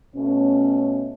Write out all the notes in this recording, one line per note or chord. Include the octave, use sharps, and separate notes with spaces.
B2 A3 C#4